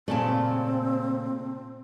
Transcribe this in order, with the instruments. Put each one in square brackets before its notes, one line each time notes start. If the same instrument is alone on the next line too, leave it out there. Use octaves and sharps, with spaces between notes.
[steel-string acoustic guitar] A#2 C#3 A3 [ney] C4 [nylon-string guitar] D5 A5